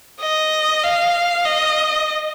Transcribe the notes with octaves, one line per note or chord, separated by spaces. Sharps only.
D#5
F5
D#5